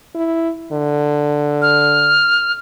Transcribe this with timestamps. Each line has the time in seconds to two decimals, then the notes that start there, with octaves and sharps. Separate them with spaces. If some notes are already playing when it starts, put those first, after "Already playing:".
0.15 E4
0.72 D3
1.62 F6